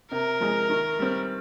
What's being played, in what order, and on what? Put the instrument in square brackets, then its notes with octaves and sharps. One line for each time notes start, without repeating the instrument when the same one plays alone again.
[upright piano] C3 [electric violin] A#4
[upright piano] F3 G#3
D#3
G3 C4